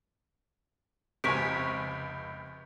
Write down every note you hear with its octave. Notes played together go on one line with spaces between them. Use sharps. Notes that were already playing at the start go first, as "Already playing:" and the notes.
F1 C#2 C3 G#5 C#6 B6 D7